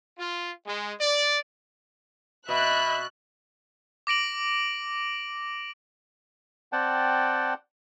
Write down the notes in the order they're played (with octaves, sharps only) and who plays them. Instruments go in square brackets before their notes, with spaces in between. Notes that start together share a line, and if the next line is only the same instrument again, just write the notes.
[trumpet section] F4
G#3
D5
[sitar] B2 [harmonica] D#5 B5 [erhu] E5 [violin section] F#6
[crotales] D6 A#6 D7 F#7
[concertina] C4 D5 F#5 G5 A5